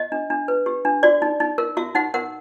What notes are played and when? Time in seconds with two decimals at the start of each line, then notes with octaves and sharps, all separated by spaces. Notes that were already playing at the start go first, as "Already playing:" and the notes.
Already playing: D#5
0.12 D4
0.30 D4
0.48 B4
0.66 G4
0.85 D4
1.03 F#4 D5
1.22 D#4
1.40 D#4
1.58 A#4
1.77 F#4 E5
1.95 D#4 F#5
2.14 A#4 F#5